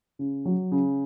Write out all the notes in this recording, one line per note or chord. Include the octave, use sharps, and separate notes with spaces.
C#3
F#3
C#3